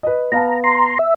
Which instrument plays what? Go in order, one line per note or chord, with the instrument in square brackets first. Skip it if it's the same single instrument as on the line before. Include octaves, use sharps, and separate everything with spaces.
[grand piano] B4 D#5
[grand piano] B3 F5 A5 [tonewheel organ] A#5
[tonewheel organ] A#5 C6
E5